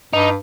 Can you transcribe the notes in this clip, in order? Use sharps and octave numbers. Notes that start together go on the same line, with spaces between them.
G2 D#4